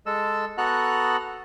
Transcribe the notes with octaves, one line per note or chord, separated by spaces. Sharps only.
G#3 A4 E6
B3 F#4 A4 F#5 A#5 F#6